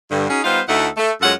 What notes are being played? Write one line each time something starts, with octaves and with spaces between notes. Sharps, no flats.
G2 D3
C#4 D#4 F#4 G#4
G3 B3 D#4 F4 C5 F5
D2 A3 D#4 E4 A4 F#5
A3
F#2 G#3 F4 A4 C#5 F#5